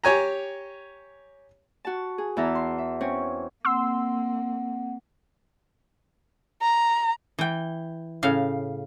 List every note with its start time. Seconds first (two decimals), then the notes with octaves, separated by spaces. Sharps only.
0.04 G4 C#5 G#5 A#5
1.85 F#4 A5
2.18 G#4
2.37 E2 E3 E5 A5 A#5
2.55 C6
2.78 E5
3.01 C4 C#4 C#5
3.65 A#3 C4 F#5 C6 E6
6.61 A#5
7.39 E3 G5
8.23 A2 C#3 F5